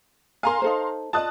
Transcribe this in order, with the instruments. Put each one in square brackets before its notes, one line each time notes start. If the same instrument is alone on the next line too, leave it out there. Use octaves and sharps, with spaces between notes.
[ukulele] A#4 G#5 [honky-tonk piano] F5 A#5 C6
[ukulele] D#4 A4 C5
[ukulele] F4 D5 D#5 [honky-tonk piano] A5 D#6 F#6